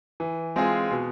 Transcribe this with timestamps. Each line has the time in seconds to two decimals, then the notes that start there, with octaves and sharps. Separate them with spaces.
0.20 E3
0.56 G#3 C4 F4 G#4
0.91 B2